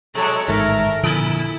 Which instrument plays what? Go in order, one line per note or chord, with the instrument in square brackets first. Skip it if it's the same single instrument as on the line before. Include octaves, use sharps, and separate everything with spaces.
[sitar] B2 F#3 G#3 [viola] A4 C#5
[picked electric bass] A1 G#2 D#3 [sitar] A4 E5 [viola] A#4
[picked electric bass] A#2 D3 F3 [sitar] A#3 [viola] E4